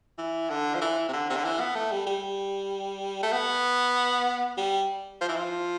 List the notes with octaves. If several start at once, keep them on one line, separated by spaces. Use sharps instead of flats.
E3
D3
F3
E3
C3
D3
C3
D3
E3
B3
A3
G3
G3
A3
B3
G3
F3
E3
F3